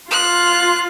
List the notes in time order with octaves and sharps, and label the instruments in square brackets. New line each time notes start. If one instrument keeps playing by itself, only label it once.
[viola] F4 [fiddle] F#6